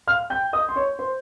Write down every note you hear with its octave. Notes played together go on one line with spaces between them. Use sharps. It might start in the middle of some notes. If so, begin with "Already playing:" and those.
F5 F6
G5 G6
D#5 D#6
C6
C#5 C#6
C5 C6